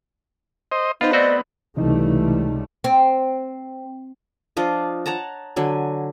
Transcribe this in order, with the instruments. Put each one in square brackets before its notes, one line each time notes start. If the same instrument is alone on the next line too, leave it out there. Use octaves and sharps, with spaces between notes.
[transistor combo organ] C5 D#5
[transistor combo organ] B3 [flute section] D#4 [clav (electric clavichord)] F4 [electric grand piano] C5 D#5 F5
[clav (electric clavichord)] A3 C4 F#4 [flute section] D5
[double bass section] C#2 G3 A3 [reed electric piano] C3 D#4 [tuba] E3
[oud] C4
[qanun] F3 D4 F4 D#5
C#5 F#5 A5 A#5
D3 F#3 G#5